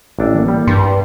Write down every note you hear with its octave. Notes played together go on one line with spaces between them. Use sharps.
A1 D4 A4
E3 A#3
G3
G2 C6